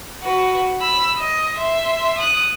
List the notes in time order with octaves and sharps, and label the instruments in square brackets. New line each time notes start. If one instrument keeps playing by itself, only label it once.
[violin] F#4 B4
B5 E6
D#5
E5 C6
D#6 F#6